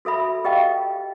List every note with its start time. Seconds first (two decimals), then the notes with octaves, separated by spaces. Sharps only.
0.05 F#4 A4 E5 B5
0.45 G4 D#5 F5 G5